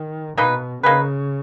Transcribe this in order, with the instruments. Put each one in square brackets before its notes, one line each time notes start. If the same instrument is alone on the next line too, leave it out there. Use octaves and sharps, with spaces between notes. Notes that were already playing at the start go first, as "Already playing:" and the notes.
Already playing: [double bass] D#3
[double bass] B2 [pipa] A#3 D#4 G#4 B4
[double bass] C#3 [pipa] A#3 D#4 G#4 B4